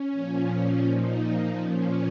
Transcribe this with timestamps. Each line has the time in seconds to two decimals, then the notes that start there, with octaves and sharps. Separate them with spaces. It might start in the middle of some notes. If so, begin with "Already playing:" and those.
Already playing: C#4
0.12 A#2 F3
0.85 A#2 F3 D#4
1.23 D#4
1.59 A#2 F3 C#4